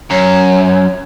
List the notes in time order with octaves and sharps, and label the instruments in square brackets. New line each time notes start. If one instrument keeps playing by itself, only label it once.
[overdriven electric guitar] F#2 [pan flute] C#5
[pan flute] C#5